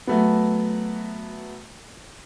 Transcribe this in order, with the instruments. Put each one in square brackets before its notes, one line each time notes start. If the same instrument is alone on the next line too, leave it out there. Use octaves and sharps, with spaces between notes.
[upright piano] F#3 A3 B3